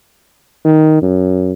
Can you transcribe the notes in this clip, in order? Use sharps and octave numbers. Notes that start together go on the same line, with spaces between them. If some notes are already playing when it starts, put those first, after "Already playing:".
D#3
F#2